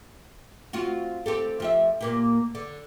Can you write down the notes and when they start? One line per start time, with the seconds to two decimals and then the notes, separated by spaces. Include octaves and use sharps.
0.73 C4 F4 F#4
1.26 C4 G4 A4
1.60 F3 G4 E5
2.01 A#2 A#3 G4
2.55 D3